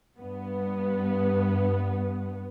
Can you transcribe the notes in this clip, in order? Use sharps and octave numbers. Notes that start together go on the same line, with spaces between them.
G2 B3